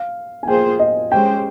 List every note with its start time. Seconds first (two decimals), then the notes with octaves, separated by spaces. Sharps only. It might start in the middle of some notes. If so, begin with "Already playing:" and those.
Already playing: F5
0.43 G#5
0.47 A#3 F4 G#4 C5 G5
0.79 D#5
1.11 G#3 C#4 G4 C5 G5